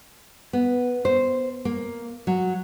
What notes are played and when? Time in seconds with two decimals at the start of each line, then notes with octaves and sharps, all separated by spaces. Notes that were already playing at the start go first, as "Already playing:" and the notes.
0.53 B3
1.05 C5
1.65 A#3
2.27 F#3